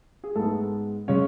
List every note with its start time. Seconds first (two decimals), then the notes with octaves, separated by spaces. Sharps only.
0.24 G#4
0.35 G#2 G#3 A3 B3 A4
1.08 C#3 G#3 C#4 C#5